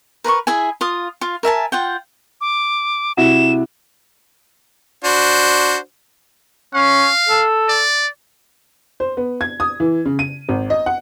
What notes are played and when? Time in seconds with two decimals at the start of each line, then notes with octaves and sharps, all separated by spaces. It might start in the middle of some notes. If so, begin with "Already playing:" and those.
0.24 A#4 B4 B5 C#6
0.47 E4 G#4 E5 G#5
0.81 F4 F5 D#6
1.21 F4 F5
1.43 A#4 E5 G#5 A5
1.72 F4 F#5 G5
2.41 D6
3.17 C3 E4 F#4 E7
5.04 D4 F#4 C5
6.74 C#4 F5
7.28 A4
7.68 D5
9.00 C5
9.17 B3
9.41 G#6
9.60 D#6
9.80 E3
10.05 C#3
10.19 D#7
10.49 G#1
10.70 D#5
10.86 F#5